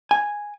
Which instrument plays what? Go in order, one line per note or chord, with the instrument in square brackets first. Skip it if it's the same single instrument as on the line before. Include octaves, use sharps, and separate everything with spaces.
[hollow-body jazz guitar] G#5